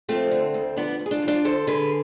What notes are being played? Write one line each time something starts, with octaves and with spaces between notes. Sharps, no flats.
F3 A3 C4
D3
D2
F3 B3 D4
D2
G#4
D4 F4
F3
D4 F4
D3 A4 C5
D3 G#4 B4